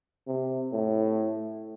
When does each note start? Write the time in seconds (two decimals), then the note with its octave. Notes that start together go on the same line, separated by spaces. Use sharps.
0.27 C3
0.72 A2